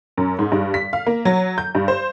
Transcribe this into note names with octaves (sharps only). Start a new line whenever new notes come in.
F#2
G#2
G2
B6
F5
A#3
F#3
G6
G2
C5